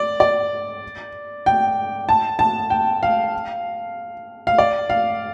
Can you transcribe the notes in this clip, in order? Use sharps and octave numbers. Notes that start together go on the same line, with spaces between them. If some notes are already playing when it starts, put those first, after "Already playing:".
Already playing: D5
D5
G5
A5
A5
G5
F5
F5
D5
F5